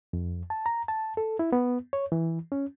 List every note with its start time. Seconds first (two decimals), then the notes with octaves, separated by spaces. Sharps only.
0.13 F2
0.50 A5
0.66 A#5
0.88 A5
1.17 A4
1.39 E4
1.53 B3
1.93 C#5
2.12 E3
2.52 C#4